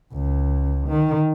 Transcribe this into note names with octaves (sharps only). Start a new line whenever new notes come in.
C#2
D#3